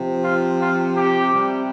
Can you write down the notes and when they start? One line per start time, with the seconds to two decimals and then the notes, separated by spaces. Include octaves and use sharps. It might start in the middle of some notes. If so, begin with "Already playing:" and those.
Already playing: C3 F3
0.22 F4
0.59 F4
0.96 G4
1.33 C3 G3